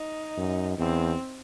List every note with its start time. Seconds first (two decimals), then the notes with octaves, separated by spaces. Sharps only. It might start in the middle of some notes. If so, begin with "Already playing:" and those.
Already playing: D#4
0.37 F#2
0.78 E2 C4